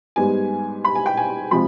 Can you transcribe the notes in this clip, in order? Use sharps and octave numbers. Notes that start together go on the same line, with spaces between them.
G#2 G3 B3 G#5
B5
G#5
G5
G#5
C3 F3 G#3 B5